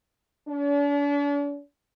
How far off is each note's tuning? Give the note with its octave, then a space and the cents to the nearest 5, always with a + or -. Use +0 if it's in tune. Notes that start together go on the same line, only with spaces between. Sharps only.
D4 -45